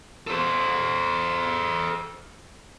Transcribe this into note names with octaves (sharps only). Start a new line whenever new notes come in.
A4 C5